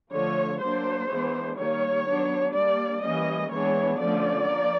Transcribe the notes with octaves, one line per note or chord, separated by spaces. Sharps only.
D3 F3 A3 C#5
F#3 A#3 D4 C5
E3 G#3 B3 D4
D#3 G3 A#3 C#5
F#3 B3 D4
G3 A#3 D4 D5
E3 G3 A#3 C#4 D#5
E3 G#3 B3 D4 C#5
D3 F3 A3 C#4 D5
F3 A#3